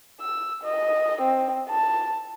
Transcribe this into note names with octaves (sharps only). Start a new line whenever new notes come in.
E6
D#5
C4
A5